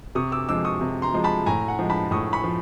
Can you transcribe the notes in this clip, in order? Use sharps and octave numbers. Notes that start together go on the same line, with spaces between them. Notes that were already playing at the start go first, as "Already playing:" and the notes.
C3 C#6 D#6
D6 E6
F3 G#3 D6 E6
C#6 D#6
C3
A#5 C6
F3 G#3
A5 B5
A2 G#5 A#5
F#5 G#5
F3 G#3
A5 B5
A2 C#6 D#6
B5 C#6
F3